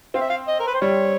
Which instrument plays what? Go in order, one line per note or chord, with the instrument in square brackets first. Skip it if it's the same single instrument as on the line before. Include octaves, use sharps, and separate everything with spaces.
[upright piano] C4 [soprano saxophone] F5
[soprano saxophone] E5
F5
D#5
A#4
B4
C5
[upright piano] G3 [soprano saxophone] C#5